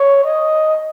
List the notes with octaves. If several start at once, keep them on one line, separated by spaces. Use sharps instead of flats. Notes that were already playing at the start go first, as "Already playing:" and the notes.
Already playing: C#5
D#5